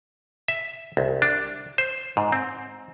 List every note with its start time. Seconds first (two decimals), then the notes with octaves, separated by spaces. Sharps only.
0.48 E5
0.97 C2
1.22 D4
1.78 C5
2.17 G#2
2.32 C4